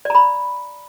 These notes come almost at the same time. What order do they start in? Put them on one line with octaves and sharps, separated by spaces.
D5 A#5 B5